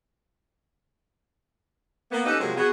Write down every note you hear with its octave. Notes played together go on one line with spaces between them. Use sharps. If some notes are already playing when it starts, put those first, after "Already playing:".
A#3 B3
C#4 D#4 G4 A4 B4 D#5
C3 F3 F#3 G#3 A#3
B3 F#4 G#4